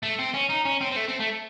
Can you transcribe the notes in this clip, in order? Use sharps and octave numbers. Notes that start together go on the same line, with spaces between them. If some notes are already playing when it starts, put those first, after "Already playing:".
A3
C4
C#4
D#4
C#4
C4
C4
A3
C4
A3